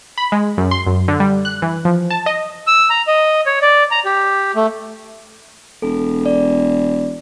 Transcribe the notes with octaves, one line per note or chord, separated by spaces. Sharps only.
B5
G#3
F#2
C6
F#2
D3
G3
F#6
E3
F3
A5
D#5
E6
A#5
D#5
C#5
D5
A#5
G4
A3
E1 A4
D5